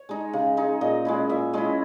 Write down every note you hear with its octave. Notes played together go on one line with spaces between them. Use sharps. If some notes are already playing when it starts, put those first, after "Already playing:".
Already playing: C#5
G#3 D#4
C#3
G#3 D#4
A#2 D#5
G#3 C#4 E4
A#2 E5
G#3 C#4 E4 D#5